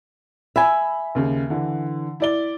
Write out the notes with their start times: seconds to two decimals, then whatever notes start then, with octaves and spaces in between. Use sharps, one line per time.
0.56 E5 G#5 B5
1.15 D#2 C#3
1.50 D3 E3
2.20 E4 D5 G7